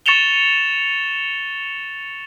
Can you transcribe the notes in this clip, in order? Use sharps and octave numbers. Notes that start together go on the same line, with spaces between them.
C#6 A6 C#7 E7 F7 G7